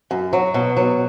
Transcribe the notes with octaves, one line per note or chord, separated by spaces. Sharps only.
F#2
F#3
B2
F#3